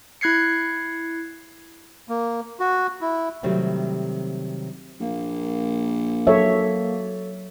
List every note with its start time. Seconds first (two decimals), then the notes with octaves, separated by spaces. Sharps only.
0.21 E4 F#6 G#6 C7 C#7
2.09 A#3
2.60 F#4
3.01 E4
3.43 C3 D#3 F#3 G3 A3 C4
5.00 A#1 A#3
6.27 F#3 A4 C#5 E5